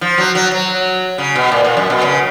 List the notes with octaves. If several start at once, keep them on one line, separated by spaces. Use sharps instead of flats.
F3
F#3
F#3
F#3
C#3
B2
A#2
A#2
F#2
B2
C#3